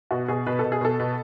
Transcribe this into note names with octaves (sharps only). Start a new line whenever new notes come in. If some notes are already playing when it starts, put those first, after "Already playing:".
B2 F#4
B2 G#4
B2 B4
B2 A4
G#4
B2 A4
B2